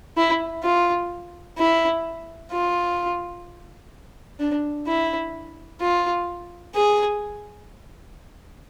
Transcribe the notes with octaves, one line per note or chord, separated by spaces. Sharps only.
E4
F4
E4
F4
D4
E4
F4
G#4